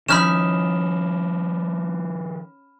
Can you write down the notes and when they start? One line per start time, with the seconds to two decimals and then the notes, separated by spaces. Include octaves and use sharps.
0.09 D#3 F3 C#4 D#4 E5 B5 F6 E7